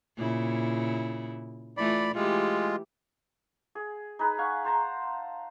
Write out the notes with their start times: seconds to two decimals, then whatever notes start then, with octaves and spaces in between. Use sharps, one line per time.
0.17 A#2 C#3 E4
1.77 E3 A3 F4 D5 B5
2.15 E3 G#3 A3 F4 G4
3.75 G#4
4.19 D#4 G#4 B4
4.38 F5 F#5 G#5 C#6
4.65 C5 A5 A#5